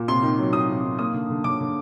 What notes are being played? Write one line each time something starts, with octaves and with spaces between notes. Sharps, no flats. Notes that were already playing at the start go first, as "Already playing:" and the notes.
Already playing: A#2
C3 C6
D#3
F#3
C3 D#6
C3
D#3
A#3 D#6
D3
D3
D3 D6
D3